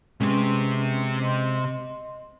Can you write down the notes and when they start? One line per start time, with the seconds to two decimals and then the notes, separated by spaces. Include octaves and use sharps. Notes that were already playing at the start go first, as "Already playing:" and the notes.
0.21 C3 G#3 C#4 G4 B4 C6
1.22 D#5 C6